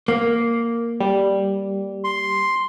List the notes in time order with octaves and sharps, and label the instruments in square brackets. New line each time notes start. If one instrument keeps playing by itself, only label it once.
[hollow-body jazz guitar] A#3
[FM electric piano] G3
[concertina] C6